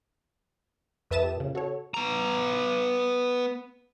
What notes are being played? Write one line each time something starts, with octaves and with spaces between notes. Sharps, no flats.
F2 B4 E5 A5 D#6 E7
G4
A#2 C#3
F#4 A4 C#5
B3 A#5